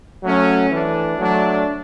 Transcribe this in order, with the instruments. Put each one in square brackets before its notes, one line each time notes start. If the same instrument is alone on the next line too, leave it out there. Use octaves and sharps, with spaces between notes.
[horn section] F#3 A3 C#4
E3 A3 D4
F#3 A3 D4